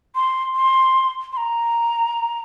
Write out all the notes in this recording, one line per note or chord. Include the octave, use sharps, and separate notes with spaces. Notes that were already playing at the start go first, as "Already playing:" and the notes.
C6
C6
C6
A#5